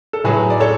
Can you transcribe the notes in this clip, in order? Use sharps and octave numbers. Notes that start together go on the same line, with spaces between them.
A4
A2 F#3 G#4 B4
D5
A4 C#5